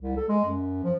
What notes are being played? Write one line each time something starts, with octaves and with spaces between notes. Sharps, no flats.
C2
A4
G#3
F#2
F3